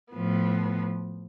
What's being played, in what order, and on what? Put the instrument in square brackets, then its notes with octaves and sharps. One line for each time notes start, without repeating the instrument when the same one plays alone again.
[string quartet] A2 F3 B3